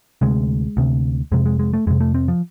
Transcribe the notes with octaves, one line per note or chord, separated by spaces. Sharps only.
D2 C3 G#3
D2 C3
F2 C3 G#3
G#3
G#3
A3
F2 C3 G#3
A3
C4
F3